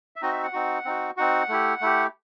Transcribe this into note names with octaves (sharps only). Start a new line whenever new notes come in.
E5
C4 D#4 F#4 D#5
E5
F#5
C4 D#4 F#4
C4 D#4 F#4
C4 D#4 F#4 F#5
A3 E4 G4
A3 E4 G4